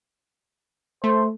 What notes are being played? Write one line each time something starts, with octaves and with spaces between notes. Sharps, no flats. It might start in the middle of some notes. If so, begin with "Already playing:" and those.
A3 C5